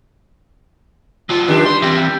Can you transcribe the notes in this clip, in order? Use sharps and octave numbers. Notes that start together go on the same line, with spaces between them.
F#3 F4
D#3 D4 G4
G3 C6
E3 C4